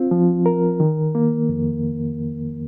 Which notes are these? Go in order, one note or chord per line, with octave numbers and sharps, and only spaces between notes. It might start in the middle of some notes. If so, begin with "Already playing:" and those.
Already playing: C4 F4
F3
A#4
D#3
A#3
F2